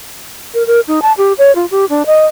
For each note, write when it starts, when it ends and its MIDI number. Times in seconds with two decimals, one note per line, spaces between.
0.54 0.66 70
0.67 0.80 70
0.87 1.02 63
1.02 1.13 81
1.18 1.33 67
1.38 1.54 73
1.55 1.66 65
1.71 1.85 67
1.89 2.06 62
2.06 2.26 75